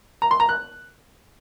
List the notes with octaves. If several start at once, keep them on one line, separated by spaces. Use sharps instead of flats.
A#5
C6
A#5
F#6